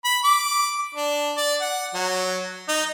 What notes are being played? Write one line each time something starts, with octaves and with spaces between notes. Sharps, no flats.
B5
D6
D4
D5
F#5
F#3
D#4